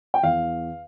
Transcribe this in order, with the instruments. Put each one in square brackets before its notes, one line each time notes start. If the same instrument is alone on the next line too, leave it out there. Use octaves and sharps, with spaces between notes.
[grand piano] G5
E2 F5